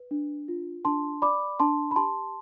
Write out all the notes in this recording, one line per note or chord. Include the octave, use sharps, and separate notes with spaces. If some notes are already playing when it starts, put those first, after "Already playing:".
Already playing: B4
D4
F4
D4 A5 C6
D5 B5 D6
D4 A5 C6
B5
G4 A5 C6